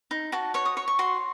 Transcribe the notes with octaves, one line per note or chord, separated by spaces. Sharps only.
D#4
F#4 A5
C#5 C#6
D#6
C#5 C#6
C#6
F#4 C6